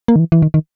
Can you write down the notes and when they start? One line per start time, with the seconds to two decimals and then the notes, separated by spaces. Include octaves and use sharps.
0.08 A#3
0.16 D#3
0.19 E3
0.32 E3
0.42 D#3
0.54 D#3